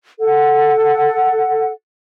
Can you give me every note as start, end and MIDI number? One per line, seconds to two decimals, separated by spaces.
0.21 1.70 69
0.21 1.70 78